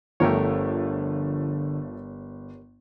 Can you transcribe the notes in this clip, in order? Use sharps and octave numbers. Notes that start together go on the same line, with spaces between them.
G1 D3 F3 A3 G4 A#4 C#5